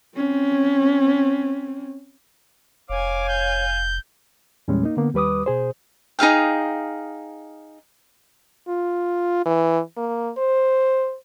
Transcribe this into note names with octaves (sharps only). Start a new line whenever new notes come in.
C4 C#4
F1 C#5 F5 G#5 D6
G6
E2 A#2 G3 G#3 C#4
A#3 D#4
D3 A#3 B3
D#2 G3 B4 D6 D#6
B2 G#4 C5
D#4 G#4 F5 G5
F4
E3
A#3
C5